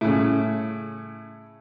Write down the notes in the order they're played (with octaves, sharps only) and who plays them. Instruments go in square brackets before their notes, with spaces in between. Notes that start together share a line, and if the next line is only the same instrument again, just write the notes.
[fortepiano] A2 C#3